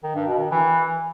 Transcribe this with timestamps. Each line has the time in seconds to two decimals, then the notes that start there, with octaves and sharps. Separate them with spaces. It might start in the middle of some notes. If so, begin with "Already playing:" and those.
0.03 D#3
0.15 G2
0.27 B2
0.39 D#3
0.51 E3